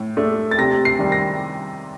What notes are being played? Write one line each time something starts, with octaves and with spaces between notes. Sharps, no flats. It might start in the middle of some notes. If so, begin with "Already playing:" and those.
Already playing: A2
A3 D4
A6
C3 A#6
C7
D#3 G3
A#6